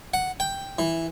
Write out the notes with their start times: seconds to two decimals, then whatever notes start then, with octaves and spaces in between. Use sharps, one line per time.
0.14 F#5
0.40 G5
0.79 E3